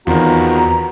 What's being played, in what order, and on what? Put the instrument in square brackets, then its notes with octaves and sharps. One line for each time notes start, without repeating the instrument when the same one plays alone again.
[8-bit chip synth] E2 [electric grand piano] D#3 C4 F4 [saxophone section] B3 F#4 [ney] A#5